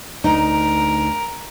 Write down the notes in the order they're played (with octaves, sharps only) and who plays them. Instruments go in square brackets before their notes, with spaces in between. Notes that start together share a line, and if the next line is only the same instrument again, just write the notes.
[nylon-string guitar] D2 D#4 [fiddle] A#4